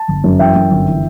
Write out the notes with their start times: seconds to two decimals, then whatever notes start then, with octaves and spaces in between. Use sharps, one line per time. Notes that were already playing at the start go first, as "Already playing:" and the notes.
Already playing: A5
0.08 G1
0.24 F#2
0.39 E3 E5 G5
0.56 F#2
0.71 G1
0.87 E3